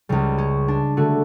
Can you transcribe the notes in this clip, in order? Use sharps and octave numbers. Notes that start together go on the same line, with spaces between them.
C#2 C#3 G3
C#4
D4
D3 A3 F#4